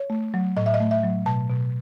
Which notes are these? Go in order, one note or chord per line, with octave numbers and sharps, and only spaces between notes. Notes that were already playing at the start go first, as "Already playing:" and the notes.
Already playing: C#5
A3
F#3
A2 D#5
E5
D#5
A3
E5
F#3
B2 A5
B2